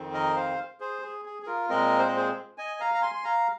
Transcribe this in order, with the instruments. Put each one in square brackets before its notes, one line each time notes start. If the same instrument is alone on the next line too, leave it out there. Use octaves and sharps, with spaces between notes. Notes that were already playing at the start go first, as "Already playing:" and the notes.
Already playing: [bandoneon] F2 D#3 C4
A#4 D#5
C5 F5
G#4 C5
G#4
G#4
G#4
F4 A#4
A#2 G#3 C4 A#4 D#5
C5
D#5
G#4 C5
D#5 G#5
F5 A#5
A#5
G#5 C6
C6
F5 A#5